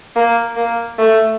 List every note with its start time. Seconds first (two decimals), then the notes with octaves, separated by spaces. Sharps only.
0.16 A#3
0.57 A#3
0.99 A3